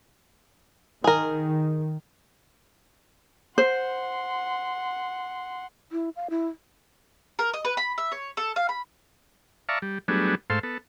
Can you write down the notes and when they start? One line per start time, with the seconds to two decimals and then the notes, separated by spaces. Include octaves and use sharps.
1.04 D#3 G#4 A#4
3.58 C5 F#5 C6
5.92 E4
6.16 F5
6.30 E4
7.39 A#4
7.54 D#5
7.65 B4
7.77 B5
7.98 E5
8.12 C#5
8.37 A4
8.56 F5
8.69 B5
9.69 D5 E5 F5 A5 A#5 C#6
9.82 G3
10.08 F#3 G3 A3 B3 D4 G#4
10.50 G#2 A3 A4 C5 F5 C6
10.63 B3 A4